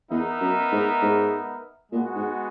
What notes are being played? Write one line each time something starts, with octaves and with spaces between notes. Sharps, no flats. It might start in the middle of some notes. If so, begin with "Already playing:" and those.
E2 B3 D#4 A#4 E5
F#2
G#2
G#2
A#2 G#3 B3 F#4
G#2